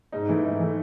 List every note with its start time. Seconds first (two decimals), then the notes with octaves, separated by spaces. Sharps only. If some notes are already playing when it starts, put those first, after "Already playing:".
0.12 G#2 D#4
0.28 E3 A3 E4
0.45 G#2 D#4
0.60 E3 A3